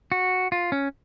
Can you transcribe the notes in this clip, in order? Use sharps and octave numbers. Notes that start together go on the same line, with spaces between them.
F#4
F4
C#4